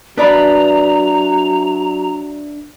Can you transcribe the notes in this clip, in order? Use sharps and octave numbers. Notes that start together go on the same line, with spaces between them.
F#3 D4 B4 D5 E5 A#5 B5 D#6